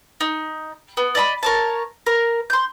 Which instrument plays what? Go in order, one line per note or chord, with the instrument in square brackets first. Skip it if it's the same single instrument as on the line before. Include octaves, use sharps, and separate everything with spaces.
[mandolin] D#4
B3
D5 D#5 A#5 B5
A#4 C#5 A5
A#4
C6 G6